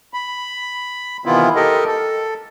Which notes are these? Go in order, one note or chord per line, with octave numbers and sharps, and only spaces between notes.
B5
C3 D#3 E3 B3 E4 F4
G4 A4 A#4 D#5
A4